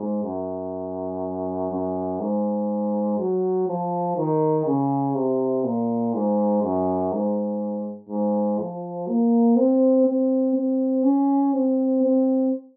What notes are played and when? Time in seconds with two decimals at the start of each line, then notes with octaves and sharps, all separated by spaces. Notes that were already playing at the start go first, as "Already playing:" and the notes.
Already playing: G#2
0.24 F#2
1.71 F#2
2.20 G#2
3.19 F#3
3.68 F3
4.17 D#3
4.66 C#3
5.15 C3
5.64 A#2
6.14 G#2
6.63 F#2
7.12 G#2
8.10 G#2
8.59 F3
9.08 A#3
9.56 C4
10.07 C4
10.55 C4
11.04 C#4
11.54 C4
12.03 C4